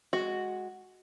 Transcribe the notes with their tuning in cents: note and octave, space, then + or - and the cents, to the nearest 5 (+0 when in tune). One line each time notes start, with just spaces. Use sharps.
G#3 +0 F#4 +0